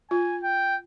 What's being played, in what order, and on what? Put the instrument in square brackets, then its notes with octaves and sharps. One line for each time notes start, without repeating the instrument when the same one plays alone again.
[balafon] F4 [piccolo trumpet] G#5
[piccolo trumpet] G5